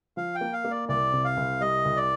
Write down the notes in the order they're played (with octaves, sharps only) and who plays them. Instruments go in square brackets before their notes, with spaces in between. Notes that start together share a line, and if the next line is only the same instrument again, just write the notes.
[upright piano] F3 [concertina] F5
[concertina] G5
[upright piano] A#3
[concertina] F5
[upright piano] A#3
[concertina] D5
[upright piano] C2 [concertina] D5
[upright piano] C3
[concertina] F5
[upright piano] C2
[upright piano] G3 [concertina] D#5
[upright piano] C2
[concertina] D5